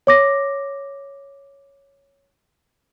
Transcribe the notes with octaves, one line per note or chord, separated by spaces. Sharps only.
C#5 D6 A#6